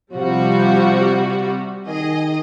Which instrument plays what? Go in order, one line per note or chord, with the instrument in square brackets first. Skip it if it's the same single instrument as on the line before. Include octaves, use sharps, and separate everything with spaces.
[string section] C3 G3 F#4 [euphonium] F3
[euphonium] D#3 [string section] G#4 D#5